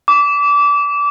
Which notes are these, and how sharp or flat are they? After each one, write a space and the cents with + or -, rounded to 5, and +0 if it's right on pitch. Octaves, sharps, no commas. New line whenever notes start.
D6 -25